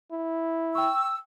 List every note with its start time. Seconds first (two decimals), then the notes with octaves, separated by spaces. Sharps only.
0.12 E4
0.75 G5 C#6 E6